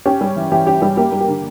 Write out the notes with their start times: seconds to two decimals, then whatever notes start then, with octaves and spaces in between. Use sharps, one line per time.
0.06 C#4 G4
0.21 G3
0.36 E3
0.52 E3 G4
0.67 C#4 G4
0.82 G3 G4
0.97 A#3 G4
1.12 G3
1.21 G4
1.28 D3